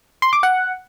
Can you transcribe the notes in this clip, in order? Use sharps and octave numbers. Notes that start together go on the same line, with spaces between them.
C6
D6
F#5